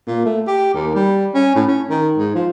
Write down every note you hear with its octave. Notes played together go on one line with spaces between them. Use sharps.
A#2
A3
G4
D#2
G3
C#4
A2
C#4
D#3
G#2
F3